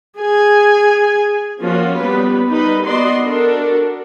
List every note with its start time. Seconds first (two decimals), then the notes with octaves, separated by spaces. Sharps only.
0.18 G#4 G#5
1.61 F3 A#3 C#4 F4 F#4
1.96 G3 B3 B4
2.48 G3 D#4 B4
2.84 B3 F#4 D5 D#5 C6
3.22 D4 F#4 A4 A#4